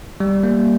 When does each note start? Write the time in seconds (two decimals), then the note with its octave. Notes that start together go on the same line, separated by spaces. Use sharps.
0.20 G3
0.43 A#3